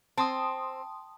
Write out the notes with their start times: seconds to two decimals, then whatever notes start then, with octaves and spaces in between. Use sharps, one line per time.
0.18 C4 A5 C6 D#6